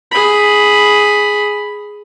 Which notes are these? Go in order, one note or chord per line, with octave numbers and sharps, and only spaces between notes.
G#4 B5